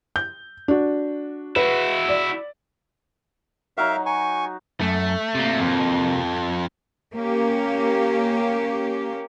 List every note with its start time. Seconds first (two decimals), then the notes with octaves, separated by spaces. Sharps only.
0.16 G6
0.68 D4 F#4
1.56 E4 F#4 B4
2.09 D5
3.77 F#3 D#4 F#4 A#4 E5 F5
4.06 G#5 C#6
4.81 F#2 A3
5.35 C3 A#3
5.59 F2
7.15 A#3 C#4 G4